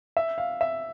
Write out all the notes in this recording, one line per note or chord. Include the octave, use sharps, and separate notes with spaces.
E5
F5
E5